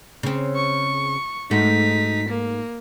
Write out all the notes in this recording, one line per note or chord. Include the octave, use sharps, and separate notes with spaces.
C#3 C4
C#6
G#2 A3 D#4 F#4 B6
A#3